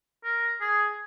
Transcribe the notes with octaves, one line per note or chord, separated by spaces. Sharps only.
A#4
G#4